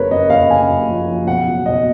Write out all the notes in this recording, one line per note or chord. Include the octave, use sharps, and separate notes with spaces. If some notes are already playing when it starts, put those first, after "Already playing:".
Already playing: F#1 F#2 A#4 B4 C#5
F#1 D#5
F#1 F5
F#1 G#5
F#2
F3
F3
B1 F#5
F#3
B1 D#5